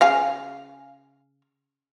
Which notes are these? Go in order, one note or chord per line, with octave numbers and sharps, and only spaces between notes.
C#3 F5 G#5